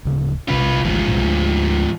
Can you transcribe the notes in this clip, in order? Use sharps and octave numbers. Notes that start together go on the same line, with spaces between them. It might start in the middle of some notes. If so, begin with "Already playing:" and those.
D1 C#3
B1 C3 C#4 F4 B4
G#1 D2 G#2 E3 F3
C2 G2 A#2
D2 D3